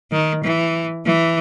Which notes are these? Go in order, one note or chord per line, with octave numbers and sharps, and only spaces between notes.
D#3
E3
E3